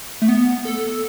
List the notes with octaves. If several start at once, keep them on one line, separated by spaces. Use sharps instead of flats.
A3
B3
A4